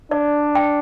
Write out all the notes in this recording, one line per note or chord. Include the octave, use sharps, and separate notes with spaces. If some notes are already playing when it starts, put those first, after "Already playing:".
D4 D5
G5